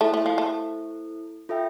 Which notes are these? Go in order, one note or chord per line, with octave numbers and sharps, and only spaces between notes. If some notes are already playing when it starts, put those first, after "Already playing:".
A3 E4 A4 C5
A3
F3
A3
F4 A4 E5 G5